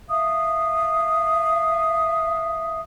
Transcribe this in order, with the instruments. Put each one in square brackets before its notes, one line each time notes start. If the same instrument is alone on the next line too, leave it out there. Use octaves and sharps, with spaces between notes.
[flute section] E5 F5 D#6